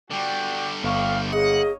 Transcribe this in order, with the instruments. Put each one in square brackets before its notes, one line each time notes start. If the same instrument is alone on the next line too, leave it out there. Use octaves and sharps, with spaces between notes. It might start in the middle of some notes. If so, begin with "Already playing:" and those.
[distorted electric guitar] D3 G3 [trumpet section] F#4 D5 G5
[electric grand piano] G1 C#6 [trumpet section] C4 F5
[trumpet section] A#3 C#5 D#5 [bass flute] G#4 [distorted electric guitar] F#5